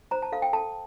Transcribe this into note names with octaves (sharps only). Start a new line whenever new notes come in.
C5 A#5
A5
A4 F5
G5
A4 A5